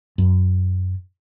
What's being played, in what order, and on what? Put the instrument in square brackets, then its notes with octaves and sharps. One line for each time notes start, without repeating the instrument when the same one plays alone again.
[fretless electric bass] F#2